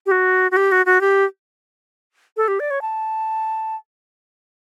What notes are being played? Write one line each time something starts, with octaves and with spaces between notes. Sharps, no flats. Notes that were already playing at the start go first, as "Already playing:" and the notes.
G4
F#4
F#4
G4
F#4
F#4
G4
A4
G4
D5
C#5
A5